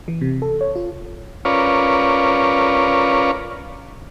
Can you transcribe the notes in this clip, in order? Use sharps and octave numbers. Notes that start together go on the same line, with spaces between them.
E3
C3
A4
C#5
F4
C#4 F4 A#4 B4 C#5 D5